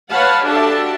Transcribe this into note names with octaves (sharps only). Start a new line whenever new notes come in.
B4 C#5 F5 F#5 A5 B5
D4 F#4 G4 A4 E5 A5